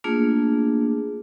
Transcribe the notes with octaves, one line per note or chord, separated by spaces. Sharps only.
A3 A#3 D4 F4 G#4